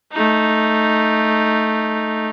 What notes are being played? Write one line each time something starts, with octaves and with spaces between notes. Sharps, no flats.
A3 D#4